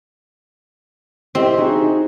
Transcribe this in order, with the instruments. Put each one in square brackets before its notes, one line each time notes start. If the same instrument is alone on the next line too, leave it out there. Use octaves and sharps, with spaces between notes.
[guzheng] C4 [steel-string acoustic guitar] E4 G4 D#5
[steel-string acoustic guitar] D#4 F#4 G#4